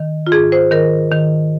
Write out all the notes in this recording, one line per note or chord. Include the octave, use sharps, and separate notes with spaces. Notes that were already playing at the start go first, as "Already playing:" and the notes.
Already playing: D#3
F4
G#2 G#4
C5
D#3 A#4
D#3